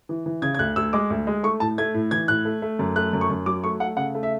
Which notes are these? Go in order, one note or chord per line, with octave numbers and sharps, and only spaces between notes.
E3
E3
C#3 G#6
G#6
D2 F#6
D2 E6
G#3 D6
D2
G#3
A3 C#6
A2 A5
A3 G#6
A2
E3 G#6
A2 F#6
A3
A3
F#2
A3 F#6
F#2
C#6
F#2
F#3 D6
A3 C#6
A3 F#5
C#3 F#5
A3
E5